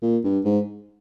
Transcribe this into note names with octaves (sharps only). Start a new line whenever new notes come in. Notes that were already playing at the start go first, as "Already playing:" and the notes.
A#2
G2
G#2